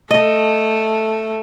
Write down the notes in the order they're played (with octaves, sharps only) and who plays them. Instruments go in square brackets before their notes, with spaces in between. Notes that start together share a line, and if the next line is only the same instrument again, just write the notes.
[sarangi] A3 [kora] D#5